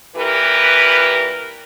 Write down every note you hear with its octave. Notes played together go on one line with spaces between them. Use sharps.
A#2 E3 G4 A#4 B4